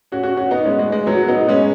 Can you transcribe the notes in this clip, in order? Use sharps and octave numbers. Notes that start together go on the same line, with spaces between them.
C#4 F#4
C#4 F#4
C#4 F#4
B3 D#4
G#3 C#4
G#3
G#3
F#3 B3
B3 D#4
G#3 C#4